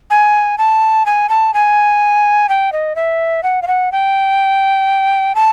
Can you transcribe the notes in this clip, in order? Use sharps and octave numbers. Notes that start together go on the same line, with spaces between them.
G#5
A5
G#5
A5
G#5
G5
D#5
E5
F#5
F5
F#5
G5
A5